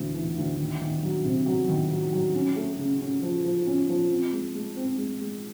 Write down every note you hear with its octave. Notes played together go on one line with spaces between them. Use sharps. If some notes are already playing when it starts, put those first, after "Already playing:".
Already playing: D2 E3
E3
D2
D#3
D#3
F#3
C3
F#3
D#3
F#3
F#3
C#4
A3
C#3
C#4
F3
F3
C#4
F3
C4
G#3
G#3
C4
G#3
G#3